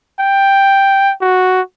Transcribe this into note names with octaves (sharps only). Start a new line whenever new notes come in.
G5
F#4